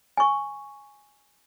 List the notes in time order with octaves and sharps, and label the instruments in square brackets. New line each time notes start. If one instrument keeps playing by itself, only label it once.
[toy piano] G#5 C#6